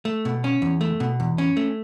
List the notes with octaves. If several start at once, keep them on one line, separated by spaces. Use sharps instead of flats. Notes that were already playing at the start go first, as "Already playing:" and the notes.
A3
B2
C#4
E2
A3
B2
E2
C#4
A3